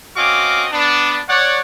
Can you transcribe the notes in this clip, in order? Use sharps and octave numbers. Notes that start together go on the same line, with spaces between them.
C4 C#4 F#4 D#5 F5 D6
B3 D4
C#5 D5 F#5